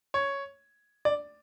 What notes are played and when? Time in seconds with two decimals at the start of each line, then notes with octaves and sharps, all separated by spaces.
0.14 C#5
1.05 D5